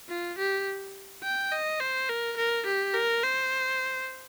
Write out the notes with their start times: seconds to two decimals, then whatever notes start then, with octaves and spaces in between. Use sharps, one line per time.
0.09 F4
0.38 G4
1.24 G5
1.52 D#5
1.80 C5
2.09 A#4
2.37 A#4
2.66 G4
2.94 A#4
3.23 C5